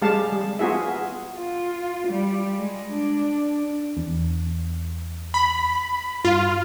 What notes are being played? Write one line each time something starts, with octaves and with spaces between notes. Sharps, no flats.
G3 G#3 G4 F5 A5
G3
B3 F4 F#4 G#4 E5
F4
G3
G#3
D4
E2
B5
G2 F4